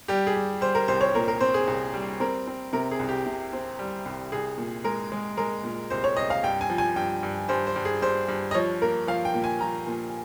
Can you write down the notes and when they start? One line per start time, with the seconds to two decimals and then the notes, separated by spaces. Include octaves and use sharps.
0.08 G3 G4
0.27 G#4
0.35 G3
0.61 G3 C5
0.75 A#4
0.88 C2 C5
1.01 C#5
1.15 A#2 A#4
1.28 A#4
1.40 C4 C5
1.54 G#4
1.67 C2
1.94 G3
2.20 C4 A#4
2.47 C4
2.73 C3 A#4
2.91 G#4
2.99 C2
3.09 G4
3.26 C3
3.53 C4
3.79 G3
4.05 C2
4.32 C2 G#4
4.58 A#2
4.84 G#3 A#4
5.12 G#3
5.37 G#3 A#4
5.64 A#2
5.90 C2 C5
6.04 C#5
6.17 C2 D#5
6.30 F5
6.43 G2 G5
6.61 G#5
6.70 F3
6.78 G#5
6.96 G2 G5
7.23 G2
7.49 G2 C5
7.67 C5
7.76 G2
7.85 G#4
8.02 G2 C5
8.28 G2
8.51 D#5
8.54 F3 C#5
8.82 A#3 A#4
9.07 F3 F5
9.25 G5
9.34 A#2
9.44 G#5
9.61 F3 A#5
9.87 A#2